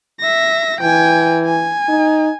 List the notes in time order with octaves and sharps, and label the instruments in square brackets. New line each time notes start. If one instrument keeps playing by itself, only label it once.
[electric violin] E5 A#6
[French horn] E3 [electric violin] G5 G#5
[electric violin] G#5
[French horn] D#4